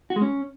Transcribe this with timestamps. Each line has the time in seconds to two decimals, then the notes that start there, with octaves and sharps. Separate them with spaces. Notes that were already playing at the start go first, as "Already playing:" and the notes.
0.10 F#4
0.16 G#3
0.22 C#4